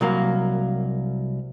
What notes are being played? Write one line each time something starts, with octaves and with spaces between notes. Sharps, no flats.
C2 F#3 A#3